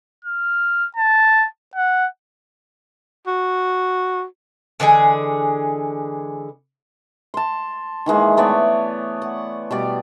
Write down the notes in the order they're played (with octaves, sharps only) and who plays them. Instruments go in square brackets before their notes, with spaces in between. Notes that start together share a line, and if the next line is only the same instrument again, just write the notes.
[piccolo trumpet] F6
A5
F#5
[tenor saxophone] F#4
[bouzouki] D3 E3 G#3 G#4
[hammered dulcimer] A5 C6
D#3 E3 G#3 A#3
A3 B3 C#5 D5
F#5
B2 G3 D5